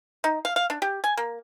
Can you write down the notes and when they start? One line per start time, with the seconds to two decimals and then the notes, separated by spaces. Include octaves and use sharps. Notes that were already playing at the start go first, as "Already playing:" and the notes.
0.24 D#4
0.45 F5
0.56 F5
0.70 D4
0.82 G4
1.04 G#5
1.17 A#3